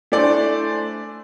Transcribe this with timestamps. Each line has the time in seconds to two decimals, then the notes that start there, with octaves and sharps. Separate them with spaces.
0.12 A3 D4 E4 C5 D5 G#5